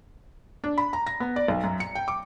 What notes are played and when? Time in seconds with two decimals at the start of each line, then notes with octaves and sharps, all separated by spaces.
0.64 D4
0.78 B5
0.93 A#5
1.07 A#6
1.20 B3
1.36 D5
1.48 B1
1.64 F#2
1.80 C#7
1.95 G5
2.08 D6